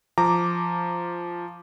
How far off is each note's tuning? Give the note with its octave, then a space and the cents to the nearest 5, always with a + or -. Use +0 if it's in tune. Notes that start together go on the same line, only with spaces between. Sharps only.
F3 -5 A#5 -15 D6 +0